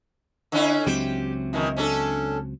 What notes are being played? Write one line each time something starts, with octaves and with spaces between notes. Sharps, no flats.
D3 C#4 E4
C#2 F#3 C4 G4
F#2 D#3 E3
C#4 D4 A4